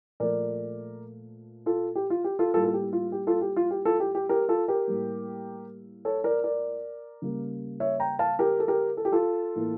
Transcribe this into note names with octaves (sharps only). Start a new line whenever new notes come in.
A#2 F3 A3 A#4 D5
F4 A4
G4
F4
G4
F4 A4
A2 G3 A#3 F4 A4
A4
G4
F4
G4
F4 A4
G4
F4
G4
F4 A4
G4
G4
G4 A#4
F4 A4
G4 A#4
A2 G3 A#3
A4 C#5
A#4 D5
A#4 D5
C#3 G3 A#3
C#5 E5
G5 A#5
F5 A5
G4 A#4
A4
G4 A#4
A4
G4
F4 A4
A2 E3 A#3